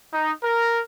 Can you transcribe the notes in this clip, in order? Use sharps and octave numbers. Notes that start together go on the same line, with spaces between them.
D#4
A#4